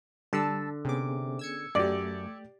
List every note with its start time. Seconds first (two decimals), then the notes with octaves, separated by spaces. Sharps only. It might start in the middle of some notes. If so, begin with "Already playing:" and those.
0.33 D3 G3 D4 A5 E6
0.85 C3 B3 C#4 G#4 D6
1.39 E6 G#6 C#7
1.75 F#2 A3 G4 D5